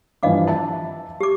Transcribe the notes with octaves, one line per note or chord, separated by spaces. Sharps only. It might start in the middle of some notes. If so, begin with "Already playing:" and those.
G2 E3 F3 D#5 F5 D6
E5 A5
G4 D6